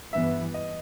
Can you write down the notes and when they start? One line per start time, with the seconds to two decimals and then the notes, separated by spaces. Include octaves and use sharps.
0.13 G2 E3 B3 E5
0.54 D#5